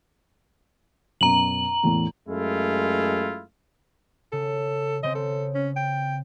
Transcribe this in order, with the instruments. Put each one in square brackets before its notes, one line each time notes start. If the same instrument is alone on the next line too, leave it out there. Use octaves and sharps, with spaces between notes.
[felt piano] F#2 B2 [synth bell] A#5 F#7
[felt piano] E2 A2
[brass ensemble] F#2 G#3 A3 E4 F4
[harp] C#3 [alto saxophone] A4
[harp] C#3 C4 [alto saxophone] D#5
[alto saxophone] A4
C#4
G5